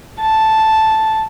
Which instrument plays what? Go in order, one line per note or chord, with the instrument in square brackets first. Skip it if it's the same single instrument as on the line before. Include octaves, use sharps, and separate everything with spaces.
[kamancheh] A5